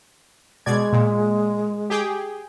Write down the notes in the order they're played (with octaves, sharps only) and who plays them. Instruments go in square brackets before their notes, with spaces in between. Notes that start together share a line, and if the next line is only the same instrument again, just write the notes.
[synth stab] B2 D5 G#6 [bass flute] G#3
[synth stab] A#2
G4 G#4 G5